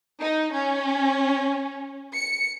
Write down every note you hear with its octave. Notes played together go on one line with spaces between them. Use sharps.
D#4
C#4
C#7